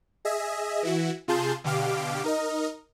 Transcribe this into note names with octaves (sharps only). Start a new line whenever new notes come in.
G#4 D#5 E5
E3 E4 F#4
C3 F4 G#4 A5 C6 G6
B2 D3 G4 F5 D6
D#4 A#4 D#5